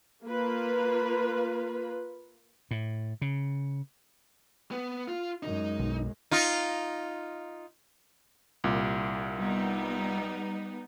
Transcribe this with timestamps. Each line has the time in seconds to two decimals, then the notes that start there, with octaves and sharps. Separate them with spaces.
0.24 A#3 F4 B4
2.71 A2
3.21 C#3
4.71 B3
5.08 F4
5.43 F#2 G#3 D#4
5.79 B1
6.31 D#4 F4
8.64 C2 A#2
9.38 G3 B3 D#4